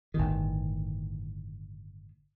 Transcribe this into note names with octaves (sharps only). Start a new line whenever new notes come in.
G1 A2 D#3